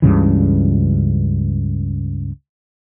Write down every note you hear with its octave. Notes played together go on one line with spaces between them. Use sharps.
C#2 G2 C#3 E3